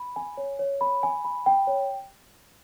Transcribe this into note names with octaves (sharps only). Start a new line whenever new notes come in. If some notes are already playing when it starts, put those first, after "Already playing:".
Already playing: B5
G#5
C#5
C#5
B5
G#5
B5
G5
C#5